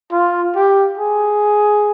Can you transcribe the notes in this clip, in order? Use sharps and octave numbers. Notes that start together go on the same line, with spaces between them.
F4
G4
G#4